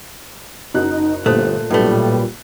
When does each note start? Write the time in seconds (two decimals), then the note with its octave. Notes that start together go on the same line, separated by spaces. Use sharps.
0.74 F#1 D#4 F#4 F#6
1.26 G1 A#2 A3 C5 D#6 F#6
1.71 B1 A2 G3 A3 F4 B4